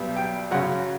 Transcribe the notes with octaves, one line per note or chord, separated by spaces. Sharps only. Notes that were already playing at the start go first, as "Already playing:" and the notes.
Already playing: B1 B2 G3
G5
F#2 C#3 F#3 F#5